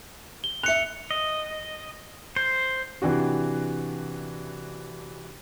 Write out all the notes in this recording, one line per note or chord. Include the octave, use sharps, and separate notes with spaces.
G7
E5 F#6 C#7 F7
D#5
C5
C3 E3 D4 F#4